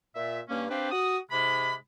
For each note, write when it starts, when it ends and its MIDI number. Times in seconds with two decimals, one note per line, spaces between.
0.16 0.41 46
0.16 0.41 76
0.49 0.65 43
0.49 0.65 58
0.49 0.65 61
0.70 0.91 60
0.70 0.91 62
0.70 0.91 67
0.70 0.91 71
0.70 0.91 77
0.92 1.18 66
0.92 1.18 87
1.31 1.76 44
1.31 1.76 48
1.31 1.76 56
1.31 1.76 83